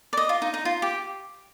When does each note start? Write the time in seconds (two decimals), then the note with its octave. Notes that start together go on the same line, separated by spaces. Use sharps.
0.13 D5
0.17 D#5
0.29 F4
0.42 D#4
0.54 D#4
0.65 F4
0.82 G4